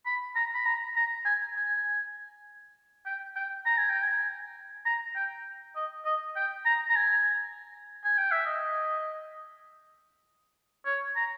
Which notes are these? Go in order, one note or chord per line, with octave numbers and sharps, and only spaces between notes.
B5
A#5
B5
A#5
A#5
G#5
G#5
G5
G5
A#5
G#5
G5
G#5
A#5
G5
D#5
D#5
G5
A#5
A#5
G#5
G#5
G5
E5
D#5
C#5
A#5